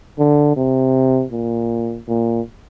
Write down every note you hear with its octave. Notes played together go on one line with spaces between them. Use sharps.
D3
C3
A#2
A#2